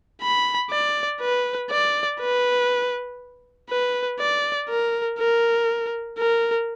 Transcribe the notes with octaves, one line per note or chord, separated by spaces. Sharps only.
B5
D5
B4
D5
B4
B4
D5
A#4
A#4
A#4